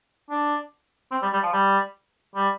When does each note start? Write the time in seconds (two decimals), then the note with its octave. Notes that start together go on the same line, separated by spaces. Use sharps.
0.30 D4
1.11 C4
1.22 G3
1.33 G3
1.43 F3
1.53 G3
2.35 G3